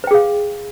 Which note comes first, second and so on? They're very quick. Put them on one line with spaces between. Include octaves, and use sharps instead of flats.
B4 G5 G#4 F5